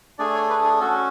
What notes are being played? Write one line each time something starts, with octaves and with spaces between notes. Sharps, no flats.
A3 D4 G#4 D5
C#5
B4
G#4
C#4 F#4 A4